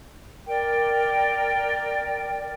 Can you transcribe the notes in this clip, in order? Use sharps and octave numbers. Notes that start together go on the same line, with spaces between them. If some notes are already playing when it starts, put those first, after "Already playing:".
A#4 D5 G5